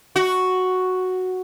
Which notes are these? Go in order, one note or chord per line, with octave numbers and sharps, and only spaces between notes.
F#4